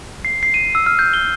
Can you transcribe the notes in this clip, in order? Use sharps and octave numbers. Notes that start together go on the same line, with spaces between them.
C7
C7
D#7
E6
F6
G6
G7